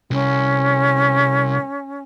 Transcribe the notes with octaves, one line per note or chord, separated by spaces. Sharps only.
C2 C#4